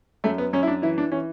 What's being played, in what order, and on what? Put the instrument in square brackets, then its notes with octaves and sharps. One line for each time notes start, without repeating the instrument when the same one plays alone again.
[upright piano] F#2 A3
B3
F#2 C#4
E4
D4
E3 E4
D4
E3 C#4